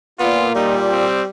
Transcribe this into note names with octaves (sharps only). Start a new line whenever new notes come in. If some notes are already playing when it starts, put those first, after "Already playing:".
A#2 B3 F4
G3 D#4
C4